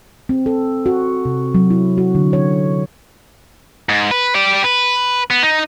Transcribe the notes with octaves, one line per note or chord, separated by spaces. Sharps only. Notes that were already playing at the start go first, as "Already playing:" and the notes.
C4
A4
F#4
C3
F#3
E4
F#4
D3
C#5
G#2
B4
G4 D5
B4
B3
D#4